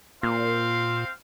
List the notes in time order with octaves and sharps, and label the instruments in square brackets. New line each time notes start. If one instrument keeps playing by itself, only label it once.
[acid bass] A#2 [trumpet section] C4 C5 F5